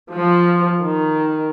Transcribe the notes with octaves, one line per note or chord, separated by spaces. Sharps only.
F3
D#3